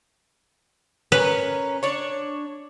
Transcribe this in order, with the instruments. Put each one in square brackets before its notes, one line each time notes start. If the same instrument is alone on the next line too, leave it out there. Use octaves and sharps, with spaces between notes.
[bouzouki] C#4 A#4 [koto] B4
[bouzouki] D4 C#5